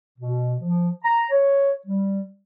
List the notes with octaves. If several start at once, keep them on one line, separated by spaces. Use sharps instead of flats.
B2
F3
A#5
C#5
G3